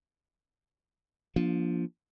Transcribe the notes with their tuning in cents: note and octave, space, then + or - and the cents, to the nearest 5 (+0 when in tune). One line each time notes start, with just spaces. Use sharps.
F3 +0 A#3 +40 D4 +0